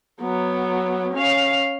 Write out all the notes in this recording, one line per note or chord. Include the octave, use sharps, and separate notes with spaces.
F#3 B3
C#4 F5